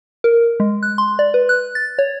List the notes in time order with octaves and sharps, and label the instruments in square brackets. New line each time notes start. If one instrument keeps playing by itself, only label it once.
[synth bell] A#4
G#3
F#6
C6
D5
B4
F#6
A6
C#5